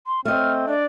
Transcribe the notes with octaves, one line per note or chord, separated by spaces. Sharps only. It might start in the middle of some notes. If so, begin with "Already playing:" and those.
C6
A3 C4 D#5 F6
D4 D5